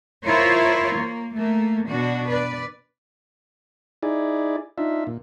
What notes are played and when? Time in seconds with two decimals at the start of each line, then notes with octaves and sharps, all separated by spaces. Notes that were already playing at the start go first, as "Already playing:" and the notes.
0.23 E4 F4 A#4 C5 C#5
0.96 A#3
1.35 A3 A#3
1.89 B2 D4 F#4
2.29 B4 D5
4.03 D#4 E4 G#4 D5
4.78 D4 D#4 F4 E5
5.07 A#2